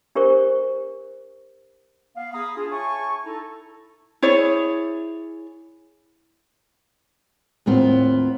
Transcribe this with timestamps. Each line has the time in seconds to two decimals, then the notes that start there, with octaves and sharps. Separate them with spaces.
0.15 D4 G4 A#4 C5 C#6
2.15 B3 F5
2.34 G#4 F5 A#5 B5 D#6
2.56 D4 F4 G#4
2.71 C#5 E5 G#5 A5 C#6
3.25 D#4 E4 A4
4.22 E4 G#4 C#5 D5
7.66 D#2 A2 B3 C4 F4